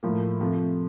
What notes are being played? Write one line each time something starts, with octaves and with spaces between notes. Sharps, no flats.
A2 F3 A#3
C3 F3 A3